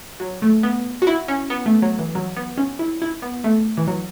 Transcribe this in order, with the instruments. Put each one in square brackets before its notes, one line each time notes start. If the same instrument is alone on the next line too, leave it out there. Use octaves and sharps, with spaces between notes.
[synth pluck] F#3
A3
B3
F#4
E4
C#4
B3
A3
F#3
E3
F#3
B3
C#4
E4
E4
B3
A3
E3
F#3